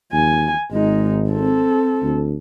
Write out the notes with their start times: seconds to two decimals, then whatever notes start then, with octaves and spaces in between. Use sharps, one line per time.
0.13 D#2 G#5
0.72 G#1 G#3 D#4
1.29 C4 A4
2.02 D2